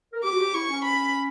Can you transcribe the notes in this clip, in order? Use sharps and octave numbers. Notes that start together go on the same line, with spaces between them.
A#4
G4 D6
F#4
G4
E4 C#6
C#4
B5